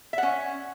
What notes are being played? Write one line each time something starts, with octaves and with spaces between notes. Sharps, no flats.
C#4 E5 F#5